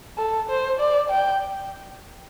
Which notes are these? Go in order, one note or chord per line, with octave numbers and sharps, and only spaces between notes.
A4
C5
D5
G5